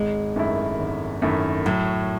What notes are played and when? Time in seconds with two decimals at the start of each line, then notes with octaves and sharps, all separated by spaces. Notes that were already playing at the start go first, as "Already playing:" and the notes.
Already playing: G#1 G#3
0.36 F#2 D#3 A3 E4
0.79 G#1
1.22 F#2 D#3 A3 E4
1.66 A2 F#3